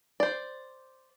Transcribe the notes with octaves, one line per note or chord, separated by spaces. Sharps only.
C5 D5